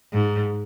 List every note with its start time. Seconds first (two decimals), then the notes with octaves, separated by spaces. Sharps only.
0.13 G#2